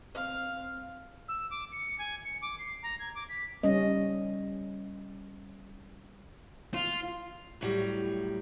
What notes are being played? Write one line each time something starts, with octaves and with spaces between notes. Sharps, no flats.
C4 F5
E6
D6
C#7
G#5
C#7
D6
C7
A#5
G#6
D6
B6
G3 C#4 D#5
F4
A2 F#3 G3